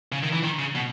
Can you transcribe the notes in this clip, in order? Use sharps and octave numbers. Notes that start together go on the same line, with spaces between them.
C#3
D#3
E3
D#3
C#3
B2